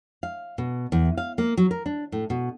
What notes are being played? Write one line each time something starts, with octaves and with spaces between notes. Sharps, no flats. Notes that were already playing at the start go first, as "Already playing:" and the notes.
F5
B2
E2
F5
A#3
F#3
A#4
D4
A2
B2